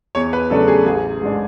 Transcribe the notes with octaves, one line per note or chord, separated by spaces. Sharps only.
E2 C#5
B4
C#3 F#3 A3 D4 A4
G#4
A1 G#4
G#2 G#3 D4